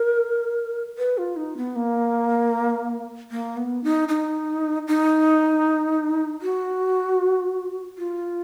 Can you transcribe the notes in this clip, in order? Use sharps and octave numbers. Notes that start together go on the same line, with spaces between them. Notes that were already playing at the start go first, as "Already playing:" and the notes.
Already playing: A#4
B4
F4
D#4
B3
A#3
A#3
B3
D#4
D#4
D#4
F#4
F4